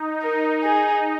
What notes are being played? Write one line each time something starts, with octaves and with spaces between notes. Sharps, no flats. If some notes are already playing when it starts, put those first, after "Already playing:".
Already playing: D#4
D#4 A#4
G#4